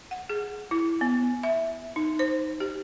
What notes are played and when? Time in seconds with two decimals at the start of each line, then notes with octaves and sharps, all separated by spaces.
0.11 F#5
0.30 G#4
0.71 E4
1.01 B3
1.43 E5
1.96 D#4
2.19 C5
2.60 G4